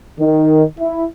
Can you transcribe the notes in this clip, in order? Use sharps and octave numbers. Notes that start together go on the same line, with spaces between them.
D#3
E4